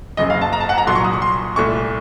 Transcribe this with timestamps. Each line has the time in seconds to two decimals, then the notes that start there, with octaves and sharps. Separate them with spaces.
0.17 F#1 F#2 C#3 D#5
0.30 F5
0.41 A5
0.53 A#5
0.60 A5
0.69 F#5
0.78 A#5
0.87 C2 A#2 F#3 C6
0.95 C#6
1.05 D#6
1.13 C#6
1.22 C6
1.56 C2 A#2 A3 C#6